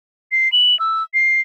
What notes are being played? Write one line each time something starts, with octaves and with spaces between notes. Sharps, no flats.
C7
F#7
E6
C7